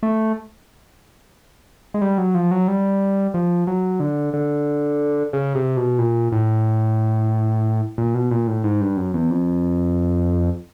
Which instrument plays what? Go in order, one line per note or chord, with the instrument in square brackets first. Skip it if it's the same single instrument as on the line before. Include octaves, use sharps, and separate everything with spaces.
[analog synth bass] A3
G#3
G3
F#3
F3
F#3
G3
F3
F#3
D3
D3
C#3
C3
B2
A#2
A2
A#2
B2
A#2
A2
G#2
G2
F#2
E2
F2